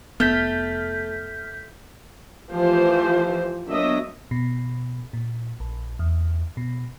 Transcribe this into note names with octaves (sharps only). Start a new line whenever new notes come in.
F1 A3 B3 F6 G6 B6
E3 F3 A3 G4 C5
F#3 A#3 B3 D4 D#5 E5
B2
A#2
A#1
E2
B2